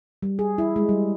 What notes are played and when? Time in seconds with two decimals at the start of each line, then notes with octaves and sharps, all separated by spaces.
0.22 G3
0.39 G#4
0.58 E4
0.76 G#3
0.89 G3